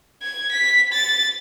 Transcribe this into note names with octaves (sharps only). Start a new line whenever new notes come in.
G#6
B6
A6